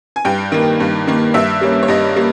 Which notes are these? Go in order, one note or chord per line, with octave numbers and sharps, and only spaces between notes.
G#5
G2 G5
D#3 A#3
G2
D#3 A#3
G2 E5
G3 A#3 C#4
C#5
G2 D#5
G3 A#3